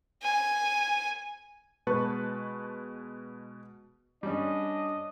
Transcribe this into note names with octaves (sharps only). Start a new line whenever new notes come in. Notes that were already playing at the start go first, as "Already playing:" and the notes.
G#5
B2 G#3 B4 A5 C#6
G3 C#4 D4 D#5